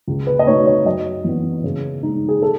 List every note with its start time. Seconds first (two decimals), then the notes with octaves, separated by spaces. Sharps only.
0.07 C#2
0.27 B4
0.39 D#5
0.46 B2 A3 D#4 C#5
0.66 C#5
0.85 F#2 D#5
1.24 E3 B3
1.64 C#3
2.03 G#3 D#4
2.28 G#4
2.42 A4